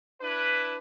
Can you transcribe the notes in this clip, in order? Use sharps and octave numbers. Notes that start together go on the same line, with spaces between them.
D4 E4 B4